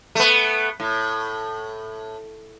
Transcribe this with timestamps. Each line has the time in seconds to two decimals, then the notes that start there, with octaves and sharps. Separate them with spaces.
0.15 A3 B3
0.80 A2